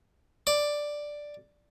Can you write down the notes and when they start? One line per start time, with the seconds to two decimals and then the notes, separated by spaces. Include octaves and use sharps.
0.47 D5